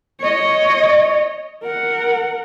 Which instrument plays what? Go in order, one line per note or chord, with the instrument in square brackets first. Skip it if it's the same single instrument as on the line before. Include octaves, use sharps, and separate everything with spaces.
[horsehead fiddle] C#5 D#5
A#4 F#5